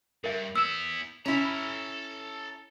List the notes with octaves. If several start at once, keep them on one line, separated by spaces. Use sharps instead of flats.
G2 A#4 E5
B3 E4 E6 E7
C#4 E4 A4 A#5